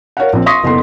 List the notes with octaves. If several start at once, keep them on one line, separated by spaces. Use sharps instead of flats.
A#4 C#5 F5 F#5
A#1 C4
F5 C6 C#6 D#6 A#6 B6
F#1 B3 A4 C6